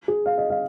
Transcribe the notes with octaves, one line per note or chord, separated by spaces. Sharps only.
G#4
F5
D#5
F5